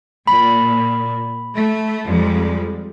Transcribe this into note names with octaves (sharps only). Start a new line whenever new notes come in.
A#2 B5
A3
F2 G3 G#3